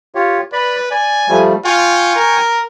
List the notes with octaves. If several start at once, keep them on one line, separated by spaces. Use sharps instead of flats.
F4 G4 C#5
B4 D5 B5
D5 G#5
F3 G3 A3
F4 G5 G#5 C#6
A#4